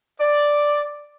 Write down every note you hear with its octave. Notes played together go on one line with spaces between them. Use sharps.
D5